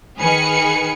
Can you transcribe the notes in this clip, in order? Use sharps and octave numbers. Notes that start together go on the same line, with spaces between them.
D#3 G#4 B4 G#5 F6 C#7